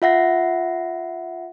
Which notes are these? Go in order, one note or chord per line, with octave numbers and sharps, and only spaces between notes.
F4 E5 F#5 A#6